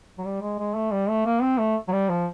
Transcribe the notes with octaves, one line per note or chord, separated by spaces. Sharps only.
F#3
G3
G#3
G#3
A3
G3
A3
A#3
C4
A3
F#3
G3
F3